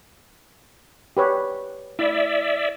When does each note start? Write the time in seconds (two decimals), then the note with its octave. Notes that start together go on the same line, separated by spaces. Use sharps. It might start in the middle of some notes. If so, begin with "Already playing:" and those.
1.17 G4 B4 C#5
1.99 E4 D5 E5